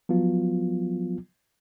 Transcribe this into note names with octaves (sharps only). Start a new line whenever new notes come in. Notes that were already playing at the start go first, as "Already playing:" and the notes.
F3 F#3 B3 F4